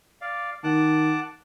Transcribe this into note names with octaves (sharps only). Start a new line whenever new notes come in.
D5 F5
D#3 F#5 A5 D6